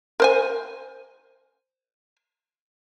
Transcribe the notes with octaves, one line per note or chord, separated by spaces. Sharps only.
A#4 C5 G#5